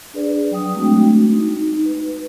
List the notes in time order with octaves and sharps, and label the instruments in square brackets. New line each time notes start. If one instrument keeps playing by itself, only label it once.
[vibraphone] D4 G#4 B4 D5
F#3 G5 D#6
G#3 A3 C4 D4 F#4
D#4
B4